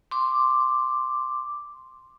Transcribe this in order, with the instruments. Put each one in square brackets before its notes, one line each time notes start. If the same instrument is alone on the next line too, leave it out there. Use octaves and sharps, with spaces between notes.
[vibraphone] C6 D6